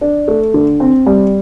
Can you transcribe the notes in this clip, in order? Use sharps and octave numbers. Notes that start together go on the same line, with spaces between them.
D4
A3
D3
C4
G3